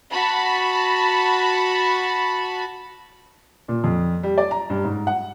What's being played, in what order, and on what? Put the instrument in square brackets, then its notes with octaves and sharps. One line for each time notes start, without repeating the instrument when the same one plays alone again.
[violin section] F#4 A5 B5
[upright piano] A#2
F2
G3
D5
A#5
G2
G#2
F#5